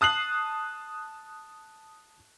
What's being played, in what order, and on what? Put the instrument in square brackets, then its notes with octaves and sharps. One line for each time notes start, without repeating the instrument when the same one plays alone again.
[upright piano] A5 D#6 F#6 C7 F#7